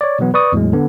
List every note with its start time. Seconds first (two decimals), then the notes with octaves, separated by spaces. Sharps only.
0.01 C#5 D5
0.19 B2 E3 F#3 B3
0.34 B4 D5 C#6 D#6
0.52 E2 A2 F#3 G#3
0.73 D3 B3